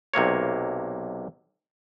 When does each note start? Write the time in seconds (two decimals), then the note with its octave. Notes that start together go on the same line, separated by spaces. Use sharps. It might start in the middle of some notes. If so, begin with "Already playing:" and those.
0.14 B1 C3 A#3 C#5